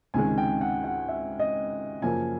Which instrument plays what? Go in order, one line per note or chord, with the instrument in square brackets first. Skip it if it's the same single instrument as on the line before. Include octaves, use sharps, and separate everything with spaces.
[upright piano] C#2 C3 D#3 G#3 [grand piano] G#5
[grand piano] G5
F#5
F#5
E5
D#5
[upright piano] F#2 C#3 F3 A#3 [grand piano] G#5